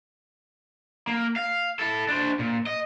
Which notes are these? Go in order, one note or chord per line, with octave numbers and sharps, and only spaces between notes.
A#3
F5
E4 A4
D4 C5
A#2
D#5